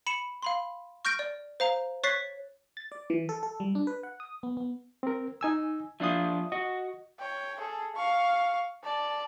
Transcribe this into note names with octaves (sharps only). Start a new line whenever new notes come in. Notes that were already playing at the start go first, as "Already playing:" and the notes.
B5 C#7 E7
F5 B5 C6
C#6 F6 G6 A#6 D7
D5
C5 F5 A#5
C#5 C#6 F#6 A6 B6 C7
A6
D5
E3
A4
A4
G3
D4
B4
F#5
D#6
B3
B3
C4 A#4
D#4 G#5 E6
F3 D4 F4 E5 D#6
F#4 D#5
C#5 G5
G#4 A4
F5 C#6
D5 A5